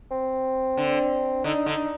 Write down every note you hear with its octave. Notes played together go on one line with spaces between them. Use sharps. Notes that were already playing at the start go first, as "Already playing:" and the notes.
C4
D3
D3 D#4
D3